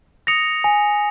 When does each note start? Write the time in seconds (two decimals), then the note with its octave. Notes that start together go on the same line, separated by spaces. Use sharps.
0.27 D#6 A#6 C#7 F7
0.64 G#5